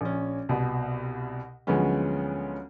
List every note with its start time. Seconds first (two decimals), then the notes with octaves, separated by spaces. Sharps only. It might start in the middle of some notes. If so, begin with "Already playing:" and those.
0.01 A#1 C#4
0.49 C2 B2
1.67 D2 F3 F#3 G#3 B3 C#4